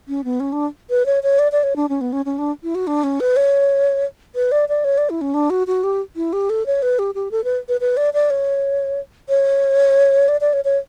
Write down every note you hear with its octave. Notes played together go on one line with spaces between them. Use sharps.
C#4
B3
C#4
D4
B4
C#5
C#5
D5
D5
C#5
D4
C#4
B3
C#4
C#4
D4
E4
F#4
D4
C#4
B4
C#5
B4
D5
D5
C#5
D5
E4
C#4
D4
F#4
F#4
G4
E4
G4
A4
C#5
B4
G4
G4
A4
B4
B4
B4
D5
D5
C#5
C#5
D5
D5
C#5
C#5